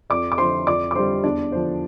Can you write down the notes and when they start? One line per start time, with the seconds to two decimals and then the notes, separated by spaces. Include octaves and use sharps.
0.10 F2 D5 D6
0.32 D6
0.38 D3 F3 C5 C6
0.67 F2 D5 D6
0.91 D6
0.95 D3 G3 C5 C6
1.24 E2 D4 D5
1.52 D3 F3 C5